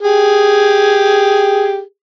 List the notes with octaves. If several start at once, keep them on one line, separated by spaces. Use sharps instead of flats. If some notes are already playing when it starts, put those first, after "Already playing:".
G4 G#4